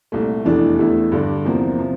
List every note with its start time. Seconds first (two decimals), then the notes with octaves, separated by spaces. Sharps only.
0.12 C2 A#2 A3
0.45 F1 E2 E3 A3 D4
0.79 E2 E3 A3 E4
1.12 G2 D3 G3 D4
1.45 E2 C3 F3 A#3
1.79 C3 F3